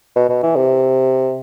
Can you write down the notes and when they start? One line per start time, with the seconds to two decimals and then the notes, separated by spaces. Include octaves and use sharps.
0.16 B2
0.29 B2
0.43 E3
0.55 C3